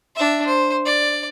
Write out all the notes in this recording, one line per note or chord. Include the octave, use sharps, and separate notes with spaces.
D4 E5
C5
D5